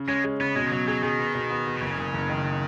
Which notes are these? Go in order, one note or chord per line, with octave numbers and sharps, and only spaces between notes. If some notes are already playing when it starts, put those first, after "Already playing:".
Already playing: C#3
G#3 C#4
G#3
C#3 B3
B2 G#3
D#3
B2 F#3
F#3 G#4
D#3 G#4
B3
B2
B3
B3
B2
F#1 C#3
F#1
F#1
D#3